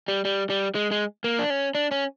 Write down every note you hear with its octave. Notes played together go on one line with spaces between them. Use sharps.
G3
G3
G3
G#3
G#3
A#3
D4
C#4
D4
C#4